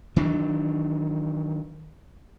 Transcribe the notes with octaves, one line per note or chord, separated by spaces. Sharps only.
D#3 E3 F#3 D4